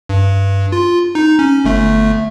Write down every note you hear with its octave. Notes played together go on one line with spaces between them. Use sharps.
G2
F4
D#4
C#4
G1 A3